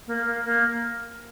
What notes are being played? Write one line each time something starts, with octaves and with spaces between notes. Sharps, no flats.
A#3
A#3
A#3